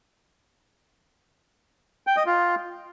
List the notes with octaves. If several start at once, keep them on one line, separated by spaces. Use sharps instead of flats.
G5
D#5
F4